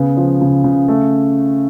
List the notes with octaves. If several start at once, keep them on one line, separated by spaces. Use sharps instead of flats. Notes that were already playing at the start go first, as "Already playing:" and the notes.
Already playing: C#3 B3
F3
C#3
C#3
A3